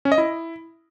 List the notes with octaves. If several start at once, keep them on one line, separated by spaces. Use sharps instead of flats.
C#4
D#5
E4